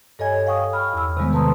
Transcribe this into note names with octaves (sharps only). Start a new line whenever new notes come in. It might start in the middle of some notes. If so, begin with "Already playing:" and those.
G2 A4 C#5 D#5 G#5 G#6
F5 G5 C#6 D#6
B5 F6
E2 E6
C3 D#3 G3 G#3 B3
A4 B4 A5 A#5 C6 D#6